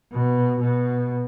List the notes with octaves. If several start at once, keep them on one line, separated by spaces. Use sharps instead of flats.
B2
B2